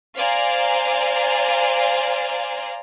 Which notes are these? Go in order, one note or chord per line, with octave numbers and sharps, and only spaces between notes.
C5 D5 F5 G#5 A#5